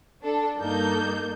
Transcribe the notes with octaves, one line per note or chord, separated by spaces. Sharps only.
D4 A4
G2 A#3 D#4 A4 G6